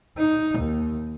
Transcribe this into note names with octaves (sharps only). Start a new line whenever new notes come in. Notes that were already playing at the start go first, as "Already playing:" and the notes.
D#4
D#2